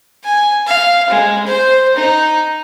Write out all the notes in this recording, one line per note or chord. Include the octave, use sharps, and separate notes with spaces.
G#5
F5
G#3
C5
D#4